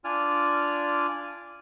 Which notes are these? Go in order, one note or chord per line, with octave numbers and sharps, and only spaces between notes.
D4 F4 D5 G#5 F6